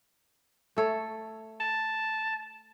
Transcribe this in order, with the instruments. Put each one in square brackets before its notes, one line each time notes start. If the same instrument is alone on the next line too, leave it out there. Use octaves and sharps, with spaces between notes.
[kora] A3 A4 C#5
[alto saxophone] A5